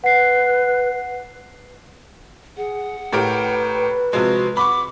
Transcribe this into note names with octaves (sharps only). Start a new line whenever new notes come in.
B4 F#5 C7
G#4 F#5
A2 G4 A#4 B4
C3 F3 G#3 F#4
F#5 B5 C#6 D6